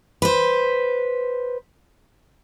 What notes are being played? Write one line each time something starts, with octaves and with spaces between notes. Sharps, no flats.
B4 C5